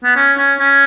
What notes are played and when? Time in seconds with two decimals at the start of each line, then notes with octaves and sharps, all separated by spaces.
0.04 B3
0.16 C#4
0.38 C#4
0.60 C#4